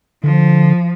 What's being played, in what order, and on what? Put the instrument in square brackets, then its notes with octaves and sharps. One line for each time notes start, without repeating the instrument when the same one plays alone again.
[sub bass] D3 [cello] F3